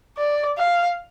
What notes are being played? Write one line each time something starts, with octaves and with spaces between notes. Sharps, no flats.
D5
F5